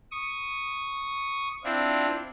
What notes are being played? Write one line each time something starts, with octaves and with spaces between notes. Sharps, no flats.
C#6 D#6
C4 D4 E4 F4